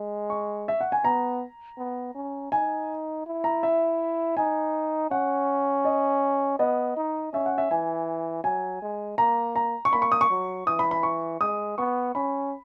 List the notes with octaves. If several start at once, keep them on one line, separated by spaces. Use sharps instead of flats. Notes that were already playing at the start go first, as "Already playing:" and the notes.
Already playing: G#3
C#6
E5
F#5
G#5
B3 A#5
B3
C#4
D#4 G#5
E4
A#5
E5
D#4 G#5
C#4 F#5
D#5
B3 D#5
D#4
C#4 E5
F#5
E5
E3 G#5
F#3 G#5
G#3
A#3 A#5
A#5
C#6
A#3 B5
C#6
D#6
C#6
F#3
E3 D#6
B5
B5
C#6
G#3 D#6
B3 C#6
C#4 B5